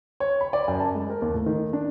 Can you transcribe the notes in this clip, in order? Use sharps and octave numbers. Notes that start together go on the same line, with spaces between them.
C#5
B5
D5
F#2
A5
G#3
A#4
D#2
A2
D#3
D4